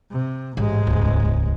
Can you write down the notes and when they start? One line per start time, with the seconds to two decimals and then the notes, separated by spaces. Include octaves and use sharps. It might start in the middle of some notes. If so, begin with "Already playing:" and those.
0.11 C3
0.57 A1 G#2 G#3
0.87 D#1 C#2